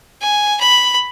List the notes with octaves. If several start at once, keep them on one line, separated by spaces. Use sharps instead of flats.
G#5
B5